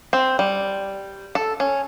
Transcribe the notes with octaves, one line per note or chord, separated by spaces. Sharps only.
C4
G3
A4
C#4